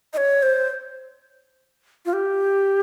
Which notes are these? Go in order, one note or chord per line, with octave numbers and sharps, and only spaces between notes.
D#5
C#5
C5
F4
G4